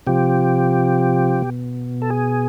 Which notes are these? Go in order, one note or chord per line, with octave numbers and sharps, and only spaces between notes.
C3 F3 G4
B2
A4
G#4